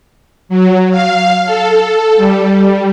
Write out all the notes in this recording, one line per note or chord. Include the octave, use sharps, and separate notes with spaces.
F#3
F5
A4
G3